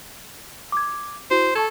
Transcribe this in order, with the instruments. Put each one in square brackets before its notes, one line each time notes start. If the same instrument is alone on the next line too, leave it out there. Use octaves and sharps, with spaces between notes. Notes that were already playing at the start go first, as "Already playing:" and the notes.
[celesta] D6 G#6
[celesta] E4 F#4 [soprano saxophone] C5
[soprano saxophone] A4 [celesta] A5 C#6 G#6